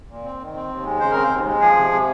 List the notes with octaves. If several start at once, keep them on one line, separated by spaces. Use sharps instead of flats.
A#2
C4
D#3
C4
D#2
G#3
C#3 C5
C4 A#4
C5
D#2
G#3
F3 G#4
C3
C3